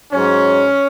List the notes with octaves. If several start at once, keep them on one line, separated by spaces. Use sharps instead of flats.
G#2 F#3 C#4